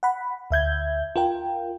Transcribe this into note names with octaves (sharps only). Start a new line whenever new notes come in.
F#5 B5
D2 E5 G6 G#6
F4 A#4 G5